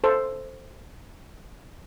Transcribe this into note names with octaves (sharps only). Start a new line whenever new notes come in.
A4 C5